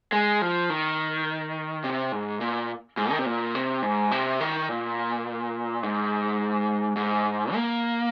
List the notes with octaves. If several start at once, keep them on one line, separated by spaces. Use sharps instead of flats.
G#3
F3
D#3
C3
G#2
A#2
G#2
D#3
C3
A#2
C3
G#2
C3
D#3
A#2
G#2
G#2
A#3